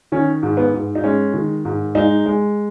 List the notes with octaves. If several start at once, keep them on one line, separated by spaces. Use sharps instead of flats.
D#3 C#4
G#2
B3
G#2
D#4
G#3 C#4
D#3
G#2
G#3 D#4
G#3